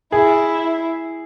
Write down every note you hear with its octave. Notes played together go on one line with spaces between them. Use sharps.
E4 G#4